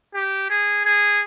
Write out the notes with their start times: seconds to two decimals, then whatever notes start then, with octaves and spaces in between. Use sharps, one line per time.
0.14 G4
0.50 G#4
0.85 G#4